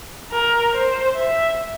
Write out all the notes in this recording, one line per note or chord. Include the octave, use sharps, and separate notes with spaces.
A#4
C5
E5